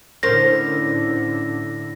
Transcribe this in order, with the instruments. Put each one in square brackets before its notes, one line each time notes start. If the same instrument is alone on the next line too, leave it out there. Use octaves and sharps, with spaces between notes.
[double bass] A2 D3 [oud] C#4 A#4 C5 [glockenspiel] A#6